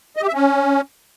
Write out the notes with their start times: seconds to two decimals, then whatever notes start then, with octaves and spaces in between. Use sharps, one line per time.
0.16 D#5
0.22 G4
0.28 E5
0.34 C#4